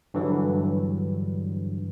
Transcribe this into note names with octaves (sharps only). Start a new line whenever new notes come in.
G2 D3 E3 F#3